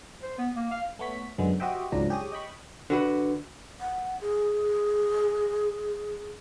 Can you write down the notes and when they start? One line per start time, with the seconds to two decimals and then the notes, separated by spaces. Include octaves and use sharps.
0.22 C5
0.38 B3
0.56 A#3
0.71 F5
0.99 A3 B3 C#5 B6
1.38 F#2 D3 G#3 B3
1.60 F#4 G4 C5 D#5 E5 G5
1.92 C#2 G#2 F3 F#3 D4 A#5
2.10 G4 G#4 C#5 D#6
2.32 D#5 G5 B5 C#6
2.90 D3 F#4 B4
3.80 F#5
4.21 G#4